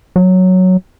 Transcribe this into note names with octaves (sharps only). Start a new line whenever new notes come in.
F#3